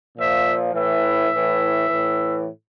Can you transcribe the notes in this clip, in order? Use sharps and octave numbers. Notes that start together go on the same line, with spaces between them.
A#2 F3 E5
A2 E3 E5
A2 E3
A2 E3